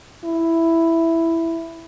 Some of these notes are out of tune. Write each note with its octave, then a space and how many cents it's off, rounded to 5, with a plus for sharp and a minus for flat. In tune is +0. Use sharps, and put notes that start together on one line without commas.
E4 +5